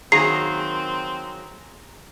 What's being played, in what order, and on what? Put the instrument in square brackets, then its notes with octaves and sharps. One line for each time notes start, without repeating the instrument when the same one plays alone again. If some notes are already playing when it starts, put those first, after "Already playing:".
[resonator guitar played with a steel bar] D#3 F#3 A#3 [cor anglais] C4 [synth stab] G#4 A#5 [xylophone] C7